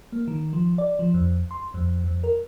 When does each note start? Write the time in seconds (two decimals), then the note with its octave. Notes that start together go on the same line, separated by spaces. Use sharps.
0.12 A#3
0.28 D#3
0.53 F3
0.78 D5
0.99 F3
1.14 F2
1.51 C6
1.74 F2
2.04 F2
2.24 A#4